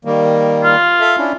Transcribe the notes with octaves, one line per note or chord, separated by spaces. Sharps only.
D#3 G3 A#3
F4
A4 E5 F5
C#4 D4 E4